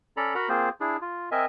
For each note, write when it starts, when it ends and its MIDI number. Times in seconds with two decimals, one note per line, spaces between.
0.17 0.34 61
0.17 0.34 69
0.17 0.34 74
0.17 0.34 82
0.17 0.34 83
0.35 0.49 66
0.35 0.49 70
0.35 0.49 78
0.35 0.49 82
0.35 0.49 83
0.49 0.69 58
0.49 0.69 60
0.49 0.69 65
0.49 0.69 68
0.49 0.69 72
0.81 0.97 62
0.81 0.97 64
0.81 0.97 68
1.01 1.29 65
1.32 1.46 60
1.32 1.46 70
1.32 1.46 75
1.32 1.46 76
1.32 1.46 80